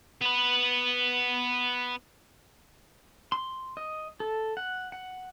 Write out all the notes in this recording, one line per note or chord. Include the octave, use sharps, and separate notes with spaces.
B3 B4
C6
D#5
A4
F#5
F#5